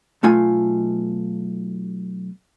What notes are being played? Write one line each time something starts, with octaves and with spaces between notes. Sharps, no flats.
B1 A3 F4 G#5